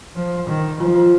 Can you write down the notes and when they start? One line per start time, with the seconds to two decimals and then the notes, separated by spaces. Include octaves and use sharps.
0.15 F3
0.47 D#3
0.80 F3 F4
0.96 F4